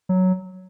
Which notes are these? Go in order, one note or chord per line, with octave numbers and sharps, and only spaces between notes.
F#3